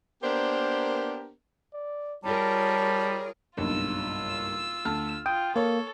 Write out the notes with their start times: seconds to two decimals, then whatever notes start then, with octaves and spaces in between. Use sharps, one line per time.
0.23 A#3 B3 D4 G4 A#4 C5
1.73 D5
2.24 G3 F4 G#4 A#4 C#5 A5
3.57 F#1 B1 G2 F4 E6
4.85 D2 A5 F6
5.26 F4 G5 D#6
5.56 A#3 A4 C#5 C#6